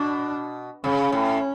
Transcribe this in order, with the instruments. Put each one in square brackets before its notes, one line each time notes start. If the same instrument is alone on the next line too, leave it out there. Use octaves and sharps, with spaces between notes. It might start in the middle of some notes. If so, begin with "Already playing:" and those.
Already playing: [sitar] B2 [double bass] D4
[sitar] C#3 [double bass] C#4
[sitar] A2